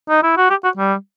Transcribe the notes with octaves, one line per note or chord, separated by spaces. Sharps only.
D#4
E4
F#4
G4
F#4
G3